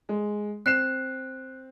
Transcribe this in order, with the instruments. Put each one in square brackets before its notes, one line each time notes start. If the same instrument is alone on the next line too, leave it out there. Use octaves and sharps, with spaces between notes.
[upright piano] G#3
[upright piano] C4 C7 E7 [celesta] F#6